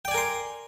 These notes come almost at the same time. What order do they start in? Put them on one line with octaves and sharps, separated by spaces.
G5 D5 G#5 A#4 C6